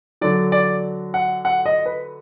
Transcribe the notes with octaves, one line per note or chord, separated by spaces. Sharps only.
D3 F#3 D5
D5
F#5
F#5
D#5
B4